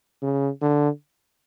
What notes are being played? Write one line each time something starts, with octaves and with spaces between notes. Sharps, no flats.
C#3
D3